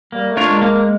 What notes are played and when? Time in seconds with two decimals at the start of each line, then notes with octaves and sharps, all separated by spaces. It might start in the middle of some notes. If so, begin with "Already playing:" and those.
0.12 G3 A#3
0.29 A3
0.37 D4 F4 A#4 C#5
0.45 G#3
0.62 A#3